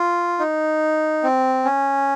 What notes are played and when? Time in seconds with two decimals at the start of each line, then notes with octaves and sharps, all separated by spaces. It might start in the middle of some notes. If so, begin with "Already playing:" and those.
Already playing: F4
0.39 D#4
1.23 C4
1.65 C#4